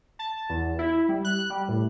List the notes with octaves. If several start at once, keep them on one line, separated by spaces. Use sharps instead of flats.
A5
E2
E4
G3
F#6
G3
A2